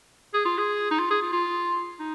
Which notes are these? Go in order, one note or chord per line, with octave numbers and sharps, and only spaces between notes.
G#4
F4
G#4
D#4
F4
G#4
F4
F4
D#4